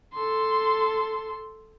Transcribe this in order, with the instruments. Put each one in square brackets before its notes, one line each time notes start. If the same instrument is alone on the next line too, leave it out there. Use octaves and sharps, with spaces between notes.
[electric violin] A4 C6